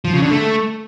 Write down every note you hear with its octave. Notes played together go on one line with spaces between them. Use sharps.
F3
C#3
D3
A3